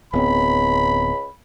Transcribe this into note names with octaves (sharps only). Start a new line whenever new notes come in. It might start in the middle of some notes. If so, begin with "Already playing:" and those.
D1 C#2 B3 C4 B5